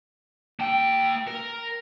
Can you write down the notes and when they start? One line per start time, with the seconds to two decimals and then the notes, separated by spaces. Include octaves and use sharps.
0.60 A#3 G5
1.28 A#4